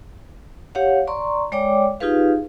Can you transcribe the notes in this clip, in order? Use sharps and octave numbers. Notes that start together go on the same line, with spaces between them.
G4 C#5 F5 F#5
D5 A#5 C6 C#6
G#3 C#5 D5 G5 D6
D#4 F4 G4 G#4 B4 F5